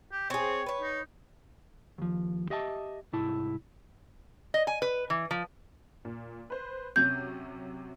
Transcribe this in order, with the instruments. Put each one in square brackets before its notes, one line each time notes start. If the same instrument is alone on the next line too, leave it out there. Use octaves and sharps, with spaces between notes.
[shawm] G4
[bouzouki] C4 G#4 [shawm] C#5
[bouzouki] B4 C#5
[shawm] D#4
[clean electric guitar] D#2 F3
G4 D#5 E5 F#5 A5
C2 G#2 E4 A5
[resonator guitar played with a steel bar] D#5
G#5
B4
E3
F3
[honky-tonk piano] A#2
B4 C5
[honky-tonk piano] C3 F#3 C#4 [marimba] G6